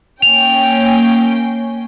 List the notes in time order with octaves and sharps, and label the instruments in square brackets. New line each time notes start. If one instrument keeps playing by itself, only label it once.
[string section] A#3 C#4 G5 [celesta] F7